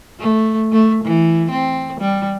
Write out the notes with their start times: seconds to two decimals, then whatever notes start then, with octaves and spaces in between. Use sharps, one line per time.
0.19 A3
0.72 A3
1.04 E3
1.51 C4
2.00 G3